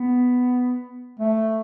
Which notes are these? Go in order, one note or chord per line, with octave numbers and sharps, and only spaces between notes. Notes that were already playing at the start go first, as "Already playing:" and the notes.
Already playing: B3
A3